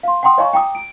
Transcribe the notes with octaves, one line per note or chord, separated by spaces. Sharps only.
F5 C6
F#5 G5 A#5 C6 D#6
C#5 D#5 F5 G#5 A#5 C#6
G5 A#5 D6 D#6
D7